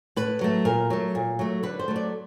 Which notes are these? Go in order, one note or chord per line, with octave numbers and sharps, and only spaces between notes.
A2 B4
F#3 A3
A#2 A#4
F#3 A3
A#2
F#3 A3
D3 B4
C5
F#3 A3
D5